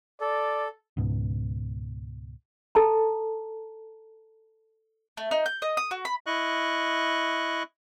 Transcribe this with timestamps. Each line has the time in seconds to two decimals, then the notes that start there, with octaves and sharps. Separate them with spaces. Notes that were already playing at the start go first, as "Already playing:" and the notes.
0.21 A4 D5
0.97 C#2 G#2 B2
2.75 A4 A5 A#5
5.17 A3
5.31 D#4
5.46 G6
5.62 D#5
5.77 D#6
5.91 F#4
6.05 B5
6.26 E4 D#5 C#6 F#6